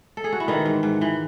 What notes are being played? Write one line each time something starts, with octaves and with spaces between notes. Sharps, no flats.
A4
G#4
F#4
E4
D#3 E3 D#4
G#2
G#2
E3